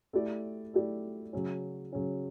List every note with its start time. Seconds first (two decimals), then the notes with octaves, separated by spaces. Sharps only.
0.13 A3 E4 G4 D5
0.74 A3 E4 G4 D5
1.33 C#3 F#3 C#4
1.93 C#3 F#3 C#4